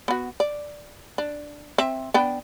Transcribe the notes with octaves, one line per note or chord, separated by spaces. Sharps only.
B3 F#4
D5
D4
C4 E5
B3 D4 G5